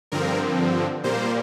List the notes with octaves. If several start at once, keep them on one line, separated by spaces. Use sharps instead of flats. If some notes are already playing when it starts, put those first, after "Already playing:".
G2 D3 F3 C4 A#4
A#2 G3 A#3 C5